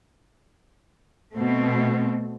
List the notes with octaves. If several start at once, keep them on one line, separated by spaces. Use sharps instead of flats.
B2 A3 C4